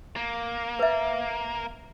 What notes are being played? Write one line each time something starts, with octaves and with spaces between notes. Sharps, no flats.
A#3
B4 E5